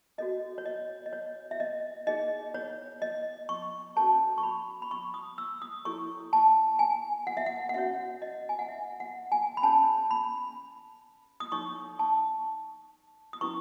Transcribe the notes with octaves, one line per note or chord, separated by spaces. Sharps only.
F#4 A4 C#5 D#5
C#5
D#5
D#5
C#5
E5
D#5
D#4 G#4 C#5 D#5
C#5
D#5
C#6
C#4 F#4 A4 C#5 A5
C#6
B5
B5
C#6
D#6
E6
D#6
E4 A4 C#5 C#6
A5
G#5
F#5
E5
F#5
F#5
C#4 F#4 C#5 E5
D#5
G#5
F#5
E5
F#5
G#5
B5
C#4 G#4 C#5 A5
B5
D#6
D#4 A4 C#5 C#6
A5
D#6
C#4 E4 B4 C#6